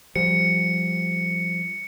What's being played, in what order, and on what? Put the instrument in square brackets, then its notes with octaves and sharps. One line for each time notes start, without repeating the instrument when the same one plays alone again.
[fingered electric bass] F3 G3 [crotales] C#7